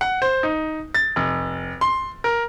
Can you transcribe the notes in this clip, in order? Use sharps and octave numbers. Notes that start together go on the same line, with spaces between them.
F#5
C5
D#4
A6
F1
C6
A#4